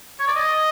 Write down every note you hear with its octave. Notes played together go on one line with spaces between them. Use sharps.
C#5
D5
D#5